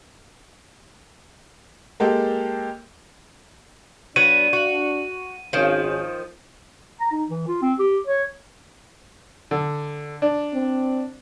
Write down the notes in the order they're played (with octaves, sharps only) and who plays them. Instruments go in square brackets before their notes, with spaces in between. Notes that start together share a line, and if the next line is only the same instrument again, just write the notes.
[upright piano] G#3 A#3 G4 A4
[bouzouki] F#3 B3 F#4 [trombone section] D4 [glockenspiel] D#7
[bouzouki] F#4
[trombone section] G#1 C#4 [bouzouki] D#3 F3
[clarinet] A#5
D#4
E3
F4
C4
G4
C#5
[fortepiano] D3
D4
[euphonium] C4